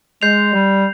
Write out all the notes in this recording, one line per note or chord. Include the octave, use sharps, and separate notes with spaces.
G#3 G6 C7 F7
G3